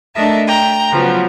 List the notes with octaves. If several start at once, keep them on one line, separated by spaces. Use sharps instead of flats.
A3 D4 A#4 D#5 E5 A5
G5 A#5
C#3 F3 F#3 B3